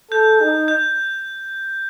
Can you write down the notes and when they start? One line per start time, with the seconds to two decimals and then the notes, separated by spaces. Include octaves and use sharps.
0.11 A4 G6
0.40 D#4
0.68 G6